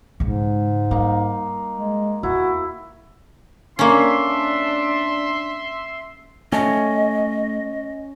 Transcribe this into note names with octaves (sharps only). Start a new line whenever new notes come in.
G#2 C#3 G#3
G3 A#3 D#4
G#3
E2 E4 F#4
A#3 C#4 D4 E5 C6
A3 C#4 D#5